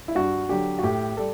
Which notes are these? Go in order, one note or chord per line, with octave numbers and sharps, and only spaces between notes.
E4
G2 F#4
D3 F#3 G4
F#4
A2 G4
G3 A4